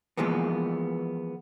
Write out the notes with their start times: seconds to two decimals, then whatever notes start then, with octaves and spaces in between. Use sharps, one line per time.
0.17 E3 F3 G#3 A#3 B3